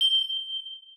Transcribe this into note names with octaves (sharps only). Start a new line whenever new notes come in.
G7